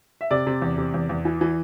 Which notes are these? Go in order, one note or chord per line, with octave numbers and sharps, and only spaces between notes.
E5
C3 D5
C3
E2
C3
E2
E2
E3
E3